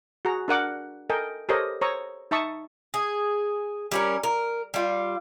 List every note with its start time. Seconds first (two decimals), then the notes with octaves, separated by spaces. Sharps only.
0.25 F#4 G#4 A#5
0.48 D4 A#4 F#5 D6
1.10 A4 A#4 D#5 G5 G#5
1.49 G4 A4 A#4 C5 C#5 D#5
1.81 C5 C#5 A#5 C#6 D#6 E6
2.31 D#4 E5 A5 C#6 D#6
2.94 G#4
3.91 G3 C#4 A#4
4.23 A#4
4.74 G3 F4